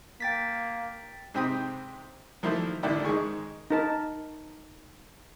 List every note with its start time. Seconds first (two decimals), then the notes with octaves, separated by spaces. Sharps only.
0.20 A#3 G5 A6 B6
1.34 G#2 C3 C4 G5 B5 D#6
2.43 D#3 F3 F#3 A3 A#3 E4
2.83 A1 D3 D#3 E4 D5 G5
3.04 G#2 D#3 G#3 G#4 C#6
3.70 D#4 A#4 A5